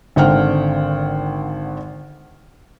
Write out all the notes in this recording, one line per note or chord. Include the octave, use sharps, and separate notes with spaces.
G#1 D3 C5 F#5 G5 F6